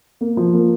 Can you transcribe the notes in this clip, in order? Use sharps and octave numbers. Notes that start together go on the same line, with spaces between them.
A#3
F3
A#3